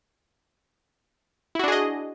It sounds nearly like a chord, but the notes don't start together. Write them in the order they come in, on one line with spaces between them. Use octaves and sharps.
E4 F#4 D4 G#4 D#5